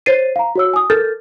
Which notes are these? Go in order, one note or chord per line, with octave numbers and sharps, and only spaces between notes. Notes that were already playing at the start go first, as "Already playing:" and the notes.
C5 C#5 A6 C7 D#7
F5 A#5
F#4 C#5 E6
G#5 D#6
A4 A#4 F6 G6 A6